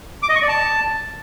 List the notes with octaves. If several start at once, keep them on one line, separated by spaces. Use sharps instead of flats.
D6
D#5
C#6
D5
A5